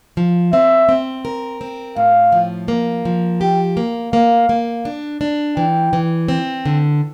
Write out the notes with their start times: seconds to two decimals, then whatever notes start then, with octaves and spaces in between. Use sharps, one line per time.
0.17 F3
0.53 C4 E5
0.89 C4
1.25 A#4
1.61 C4
1.96 A2 F5
2.32 F3
2.68 A#3
3.05 F3
3.41 G4 G5
3.77 A#3
4.13 A#3 F5
4.49 A#3
4.85 D4
5.21 D4
5.57 E3 G5
5.93 E3
6.28 C4
6.66 D3